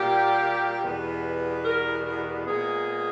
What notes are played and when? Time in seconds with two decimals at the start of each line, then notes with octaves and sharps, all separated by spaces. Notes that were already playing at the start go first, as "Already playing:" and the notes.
Already playing: A#2 G3 A#3 G4
0.83 E2 B2 G3 B3
1.63 A#4
2.04 A#4
2.46 A#2 G#3 B3 G#4